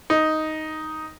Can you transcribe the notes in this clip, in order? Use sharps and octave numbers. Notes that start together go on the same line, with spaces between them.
D#4